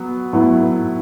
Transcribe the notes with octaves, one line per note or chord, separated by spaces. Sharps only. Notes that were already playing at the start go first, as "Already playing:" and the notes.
Already playing: F#3 B3
A2 F#3 B3 E4